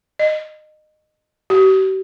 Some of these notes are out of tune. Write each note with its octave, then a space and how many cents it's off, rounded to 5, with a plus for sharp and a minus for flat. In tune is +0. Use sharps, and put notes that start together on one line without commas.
D#5 -25
G4 -45